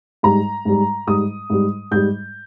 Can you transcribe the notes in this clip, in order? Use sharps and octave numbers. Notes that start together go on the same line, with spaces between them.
G#2 G3 A#5
G#2 G3
G#2 G3 D#6
G#2 G3
G#2 G3 G6